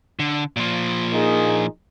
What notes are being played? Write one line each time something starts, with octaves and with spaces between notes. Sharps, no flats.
D3
A#2 F3
A#3 D#4 G#4